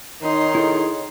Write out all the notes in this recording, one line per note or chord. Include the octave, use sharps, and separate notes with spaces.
D#3 D#4 C#5 C6
E4 G#4 A4